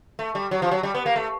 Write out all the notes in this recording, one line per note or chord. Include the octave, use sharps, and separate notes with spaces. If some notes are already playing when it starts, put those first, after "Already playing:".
A3
G3
F#3
F3
F#3
G3
B3
A#3
A3